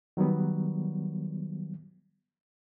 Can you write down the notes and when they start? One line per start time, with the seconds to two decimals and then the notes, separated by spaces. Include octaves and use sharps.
0.17 D#3 F#3 G3 B3